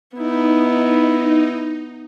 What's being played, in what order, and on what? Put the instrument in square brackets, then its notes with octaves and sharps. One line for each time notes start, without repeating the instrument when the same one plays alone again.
[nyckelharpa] B3 E4 [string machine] D#4